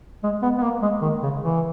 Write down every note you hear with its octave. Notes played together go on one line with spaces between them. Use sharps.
G#3
B3
B3
A#3
G#3
D#3
C#3
E3